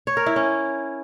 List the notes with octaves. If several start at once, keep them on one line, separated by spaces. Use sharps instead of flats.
C#5
A#4
E4
C#4